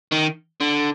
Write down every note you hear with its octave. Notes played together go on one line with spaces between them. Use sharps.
D#3
D3